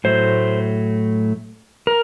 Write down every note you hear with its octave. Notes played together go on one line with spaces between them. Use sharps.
A2 F#3 A3 C5
A#4